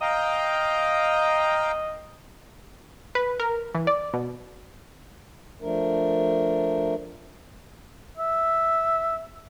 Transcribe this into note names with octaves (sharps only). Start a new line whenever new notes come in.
D#5 F5 G5 A#5
B4
A#4
E3
D5
B2
F3 A3 D4 A#4
E5